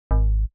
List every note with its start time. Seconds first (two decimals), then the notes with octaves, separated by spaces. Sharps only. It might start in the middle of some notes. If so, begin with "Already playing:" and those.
0.11 G#1